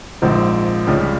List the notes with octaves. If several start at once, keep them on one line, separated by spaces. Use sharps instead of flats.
A#1 G#2 F3 C4
C#2 C#3 G3